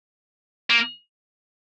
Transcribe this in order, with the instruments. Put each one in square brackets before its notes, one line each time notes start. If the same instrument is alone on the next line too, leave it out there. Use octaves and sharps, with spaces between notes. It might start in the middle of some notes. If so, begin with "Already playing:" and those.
[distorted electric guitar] A#3